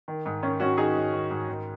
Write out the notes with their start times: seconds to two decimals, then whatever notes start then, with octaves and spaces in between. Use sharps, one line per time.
0.08 D#3
0.26 G#2
0.42 D#3 C#4
0.60 G#2 C#4 F#4
0.78 D#3 D#4 G#4
0.96 G#2
1.13 D#3
1.31 G#2
1.48 D#3